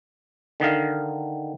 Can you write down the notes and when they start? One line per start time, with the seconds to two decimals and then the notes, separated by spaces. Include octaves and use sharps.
0.60 D3 D#3 D#5 F5